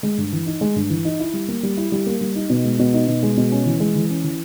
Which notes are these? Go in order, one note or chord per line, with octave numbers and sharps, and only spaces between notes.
G#3
G2
E3
D#4
G#3
G2
E3
D#4
E4
G3
A#3
G3
E4
G3
A#3
G3
D#4
B2
G#3
B2
D#4
B2
G#3
B2
C#4
E3
G#3
E3
C#4
E3